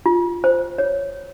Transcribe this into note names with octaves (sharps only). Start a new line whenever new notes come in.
F4
C5
C#5